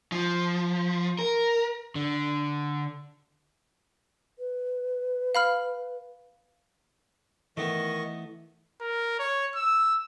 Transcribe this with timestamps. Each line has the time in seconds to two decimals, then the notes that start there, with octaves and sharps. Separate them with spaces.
0.12 F3
1.19 A#4
1.95 D3
4.39 B4
5.35 F5 B5 F6
7.57 D#3 E3 A3 B3 D#5 C#6
8.81 A#4
9.19 C#5
9.55 E6